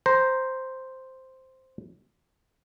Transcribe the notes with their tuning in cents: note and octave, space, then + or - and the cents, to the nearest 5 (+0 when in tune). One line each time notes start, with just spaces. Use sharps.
C5 +0 A#5 +10